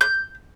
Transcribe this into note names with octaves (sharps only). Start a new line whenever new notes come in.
G6